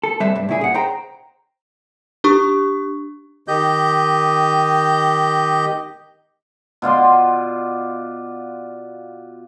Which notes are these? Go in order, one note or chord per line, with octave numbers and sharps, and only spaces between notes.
A4
C3 G3 B4 C5 E5 A5
G2
A#2 C#3 E4 G#4
G#4 F#5
C5 G5 A#5
D4 G4 C#6
D#3 G4 D#5 G6
B2 F4 D5 C6